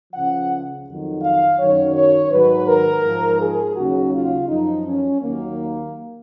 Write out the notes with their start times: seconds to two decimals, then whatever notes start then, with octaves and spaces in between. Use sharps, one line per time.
0.13 C#2 C#3 F3 F#5
0.87 F2 D#3 F#3
1.23 F5
1.59 F#2 D#3 F#3 C#5
1.95 C#5
2.31 G#2 D#3 F#3 B4
2.68 A#4
3.04 G#2 F3
3.41 G#4
3.76 D#2 C#3 F#3 F#4
4.13 F4
4.49 F#2 F3 D#4
4.86 C#4
5.21 D#2 D#3 F#3 A#3